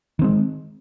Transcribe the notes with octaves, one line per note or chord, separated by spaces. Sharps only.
D#3 G#3 C4